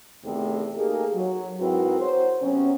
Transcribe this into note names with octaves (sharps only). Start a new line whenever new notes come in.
E2 C3 D#3 A3
A3 A#3 D#4 G4 G#4
F#3
G#2 C4 E4 F#4 A#4 B4
F#3 C5
C3 F#3 B3 C#4